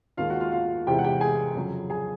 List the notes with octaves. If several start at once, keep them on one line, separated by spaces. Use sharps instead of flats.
D#2 D#3 G#3 F4 F5
F#4 F#5
F4 F5
F4 F5
E2 C3 E3 G#3 G4 G5
F#5
G4 G5
G#4 G#5
F2 C#3 F#3
G#4 G#5